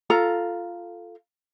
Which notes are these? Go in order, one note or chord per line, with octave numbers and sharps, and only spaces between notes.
F4 A4 A#5